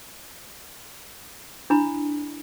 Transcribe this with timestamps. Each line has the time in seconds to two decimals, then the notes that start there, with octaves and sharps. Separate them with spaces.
1.70 D4 E4 A#5 B5